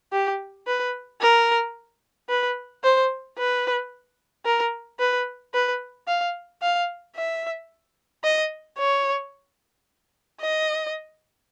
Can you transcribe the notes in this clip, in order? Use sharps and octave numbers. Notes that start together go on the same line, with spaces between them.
G4
B4
A#4
B4
C5
B4
A#4
B4
B4
F5
F5
E5
D#5
C#5
D#5